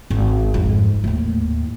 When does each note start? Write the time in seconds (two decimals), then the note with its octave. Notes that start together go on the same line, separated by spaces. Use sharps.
0.10 G#1
0.54 F2 G#2
1.04 D#2 A2